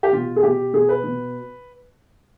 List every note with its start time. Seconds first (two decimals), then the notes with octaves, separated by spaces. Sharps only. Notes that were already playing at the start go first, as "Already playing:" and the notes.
0.03 G4
0.12 B2 F4
0.36 G#4
0.43 B2 G4
0.73 B2 G#4
0.89 B4
1.04 B2